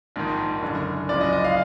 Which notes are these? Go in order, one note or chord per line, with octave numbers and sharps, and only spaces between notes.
A#1 G#2 D#3
F#1 F#2 D3
F#1 F#2 F3 G#3 D5
D#5
D#5
F5